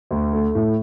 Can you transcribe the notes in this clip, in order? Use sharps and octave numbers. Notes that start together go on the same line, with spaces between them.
D2
A3
A2